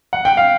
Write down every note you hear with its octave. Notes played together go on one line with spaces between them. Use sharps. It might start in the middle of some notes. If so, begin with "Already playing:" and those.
F#5
G5
F5